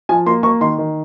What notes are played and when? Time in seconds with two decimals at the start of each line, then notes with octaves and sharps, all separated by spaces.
0.09 F3 G#5
0.26 A#3 C6
0.43 A#3 C#6
0.61 D#3 C6
0.78 D#3